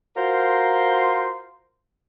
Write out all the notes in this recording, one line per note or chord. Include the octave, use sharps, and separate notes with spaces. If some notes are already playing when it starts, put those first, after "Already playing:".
F4 F#4 A#4 C5